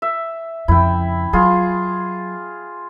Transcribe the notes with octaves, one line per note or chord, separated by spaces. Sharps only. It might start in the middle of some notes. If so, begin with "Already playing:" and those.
E5
F2 C#3 E4 G5
F#3 F4 G#4